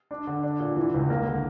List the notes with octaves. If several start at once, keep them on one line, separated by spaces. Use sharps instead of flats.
D4
D3
D4
A#2
E3
C#2
A#3
D3